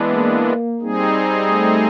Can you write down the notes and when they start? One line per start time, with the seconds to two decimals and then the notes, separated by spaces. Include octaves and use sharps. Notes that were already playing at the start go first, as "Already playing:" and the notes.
Already playing: E3 G#3 B3 D4
0.11 A#3
0.81 G3 C4 D#4 G#4
1.51 A3